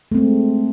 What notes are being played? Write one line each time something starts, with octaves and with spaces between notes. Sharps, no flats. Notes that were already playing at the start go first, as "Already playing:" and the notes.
G#3 A3 C4